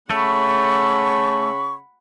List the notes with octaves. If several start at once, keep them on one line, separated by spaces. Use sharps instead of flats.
C#3 A3 F#5 B5 C#6